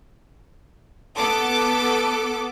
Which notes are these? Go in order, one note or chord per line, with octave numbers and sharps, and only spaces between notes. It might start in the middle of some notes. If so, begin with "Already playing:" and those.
B3 A4 D6